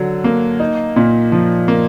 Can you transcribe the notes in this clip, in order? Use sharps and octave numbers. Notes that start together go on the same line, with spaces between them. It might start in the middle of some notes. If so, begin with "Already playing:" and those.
Already playing: D3 F#3
A#3
D#4
A#2
F3
A#3